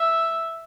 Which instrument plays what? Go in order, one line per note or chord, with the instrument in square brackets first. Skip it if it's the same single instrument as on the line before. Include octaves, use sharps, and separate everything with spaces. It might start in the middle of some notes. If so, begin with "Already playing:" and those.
Already playing: [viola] E5